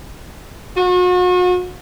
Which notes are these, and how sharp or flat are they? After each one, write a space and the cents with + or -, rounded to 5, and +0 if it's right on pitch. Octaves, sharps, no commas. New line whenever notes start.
F#4 -40